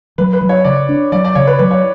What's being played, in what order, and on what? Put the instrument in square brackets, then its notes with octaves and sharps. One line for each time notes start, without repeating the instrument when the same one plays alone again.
[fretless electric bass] F#3 [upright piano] B4
[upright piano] B4
[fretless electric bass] F#3
[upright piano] C#5
[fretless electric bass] C#3 [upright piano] D5
[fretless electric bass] D4
[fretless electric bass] F#3 [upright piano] D5
[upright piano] D5
[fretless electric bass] C#3 [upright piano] C#5
[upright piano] B4
[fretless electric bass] F#3 [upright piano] B4
[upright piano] C#5